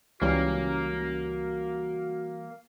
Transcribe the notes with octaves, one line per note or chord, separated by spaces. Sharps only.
C#2 E3 G3 A#3 C#4 F#4